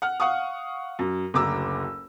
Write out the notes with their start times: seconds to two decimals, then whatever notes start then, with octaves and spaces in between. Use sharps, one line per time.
0.02 F#5 F6
0.20 F5 F#5 C#6 D#6
0.99 F#2
1.34 F#1 D2 A#5 D6 E6